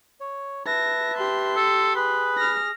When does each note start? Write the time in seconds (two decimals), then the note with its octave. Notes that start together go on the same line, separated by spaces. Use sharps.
0.20 C#5
0.66 B4 E5 A5 A#6
1.18 G4 C6
1.56 A4
1.96 G#4 B4
2.37 F6 A#6